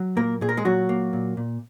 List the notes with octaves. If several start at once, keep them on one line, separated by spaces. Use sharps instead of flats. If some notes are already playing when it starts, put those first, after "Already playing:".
Already playing: F#3
A#2 A#3 A#4
A#2 G#4
A#4
G#3 G#4
A#2 F#3 F#4
A#3
A#2
A#2